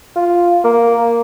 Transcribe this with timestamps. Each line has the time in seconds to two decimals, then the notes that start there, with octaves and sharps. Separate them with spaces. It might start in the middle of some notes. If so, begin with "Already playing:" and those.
0.16 F4
0.64 A#3